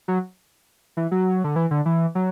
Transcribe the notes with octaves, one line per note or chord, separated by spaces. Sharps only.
F#3
E3
F#3
D3
E3
D3
E3
F#3